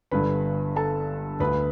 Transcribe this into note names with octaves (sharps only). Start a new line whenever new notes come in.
G1 G2 D3 B4 B5
A4 A5
D2 D3 B4 B5